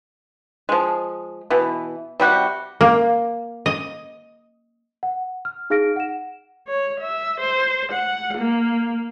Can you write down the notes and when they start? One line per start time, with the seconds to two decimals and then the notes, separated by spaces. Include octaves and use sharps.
0.69 F3 G#3
1.50 B2 E3
2.20 C3 G3 F#4 G4
2.81 A#3
3.66 D#5
5.03 F#5
5.45 F6
5.70 D#4 G#4 F5 F6 A#6 D7
5.96 F#5 E7
6.68 C#5
7.00 E5
7.40 C5
7.92 F#5
8.38 A#3